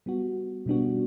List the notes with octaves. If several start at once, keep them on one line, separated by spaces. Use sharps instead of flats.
G3 B3 F#4
B2 G3 B3 D4 F#4